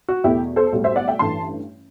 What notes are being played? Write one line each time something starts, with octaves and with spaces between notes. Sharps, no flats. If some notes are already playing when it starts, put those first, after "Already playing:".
F#4
E2 B2 A3 E4 G4
A4 C5
B1 A2 G3
C5 E5
D5 F#5
E5 G5
A1 G2 E3 A3 A5 C6